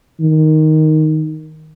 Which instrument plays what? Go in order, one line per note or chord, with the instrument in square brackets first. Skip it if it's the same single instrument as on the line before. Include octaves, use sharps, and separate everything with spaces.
[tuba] D#3